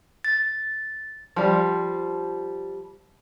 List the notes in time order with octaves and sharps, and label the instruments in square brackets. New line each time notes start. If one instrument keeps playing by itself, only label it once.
[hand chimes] A6
[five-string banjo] F3 G3